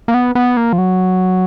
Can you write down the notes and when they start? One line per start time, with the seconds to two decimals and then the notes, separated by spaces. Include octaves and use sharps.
0.08 A#3
0.14 B3
0.35 B3
0.57 A#3
0.73 F3
0.78 F#3